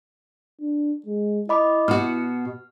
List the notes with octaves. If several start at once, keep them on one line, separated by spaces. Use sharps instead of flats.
D4
G#3
E4 D#5 B5 D6
B2 F#4 F6